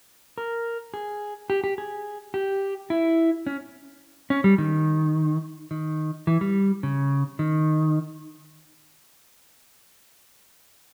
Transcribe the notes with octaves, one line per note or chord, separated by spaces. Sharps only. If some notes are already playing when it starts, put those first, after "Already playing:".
A#4
G#4
G4
G4
G#4
G4
E4
C#4
C#4
G3
D#3
D#3
E3
G3
C#3
D#3